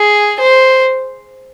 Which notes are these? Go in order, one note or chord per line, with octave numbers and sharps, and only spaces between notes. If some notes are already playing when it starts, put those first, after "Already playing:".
Already playing: G#4
C5